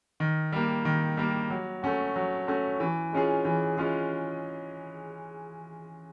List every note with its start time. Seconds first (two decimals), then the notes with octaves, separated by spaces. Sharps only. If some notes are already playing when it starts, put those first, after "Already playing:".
0.20 D#3
0.52 G3 A#3
0.85 D#3
1.17 G3 A#3
1.50 F#3
1.83 A3 C#4 F#4
2.16 F#3
2.48 A3 C#4 F#4
2.80 E3
3.12 G#3 C#4 F4 G#4
3.45 E3
3.77 G#3 C#4 F4 G#4